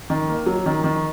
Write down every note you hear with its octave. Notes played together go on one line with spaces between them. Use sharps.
D#3
A#3
F#3
D#3
D#3